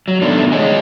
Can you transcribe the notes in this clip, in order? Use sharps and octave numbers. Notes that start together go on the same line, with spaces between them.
F#3
B2 D#3 G3 A3 D4
G#4 A4 C#5 D#5 G#5